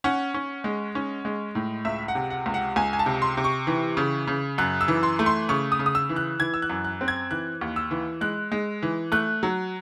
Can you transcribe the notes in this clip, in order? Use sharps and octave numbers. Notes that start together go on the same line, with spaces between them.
C#4 F#5
C#4
G#3
C#4
G#3
A2
C#2 E5
F#5
C3
F#5
C#2
F#5
C#2 G#5
G#5
A5
C3
C6
C3
C#6
E3
C#3
C#3
F#2 F#6
E6
E3
C6
A3
C6
C#3 C#6
D#6
C#3
D#6
E6
E3
F#6
E3 G#6
E6
F#6
F#2
F#6
C4
G#6
E3 F#6
D#2
E6
E3
G#3 F#6
G#3
E3
A3 F#6
F#3